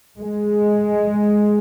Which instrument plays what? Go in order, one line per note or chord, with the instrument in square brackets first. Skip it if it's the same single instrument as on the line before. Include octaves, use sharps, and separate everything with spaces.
[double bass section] G#3